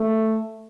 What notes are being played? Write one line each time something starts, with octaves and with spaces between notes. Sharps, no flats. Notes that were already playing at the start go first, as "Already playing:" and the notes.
Already playing: A3